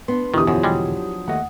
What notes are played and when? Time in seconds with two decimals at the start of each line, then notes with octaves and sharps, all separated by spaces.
0.08 B3 D4 C6
0.34 E2 B2 D3 D#3 E4 G4 D#6
0.47 F#2 F3 F#3 D4
0.63 G3 G#3
1.28 D#2 A3 D#5 F#5